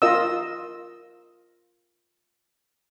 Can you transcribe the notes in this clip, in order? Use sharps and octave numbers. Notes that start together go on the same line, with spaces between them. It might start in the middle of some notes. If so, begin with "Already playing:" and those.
F4 A#4 D#5 F5 E6